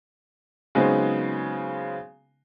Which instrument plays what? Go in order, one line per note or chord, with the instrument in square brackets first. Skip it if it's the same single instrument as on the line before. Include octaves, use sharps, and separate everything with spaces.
[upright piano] C#3 F#3 G#3 B3 C4 D#4